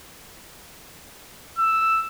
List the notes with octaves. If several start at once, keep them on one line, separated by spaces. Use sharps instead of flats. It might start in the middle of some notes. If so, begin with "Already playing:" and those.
E6